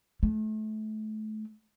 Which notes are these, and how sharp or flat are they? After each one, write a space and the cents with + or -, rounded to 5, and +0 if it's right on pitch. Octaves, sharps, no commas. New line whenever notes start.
A3 -30